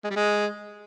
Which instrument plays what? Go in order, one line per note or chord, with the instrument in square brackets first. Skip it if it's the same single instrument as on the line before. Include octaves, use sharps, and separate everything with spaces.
[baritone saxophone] G#3
G3
G#3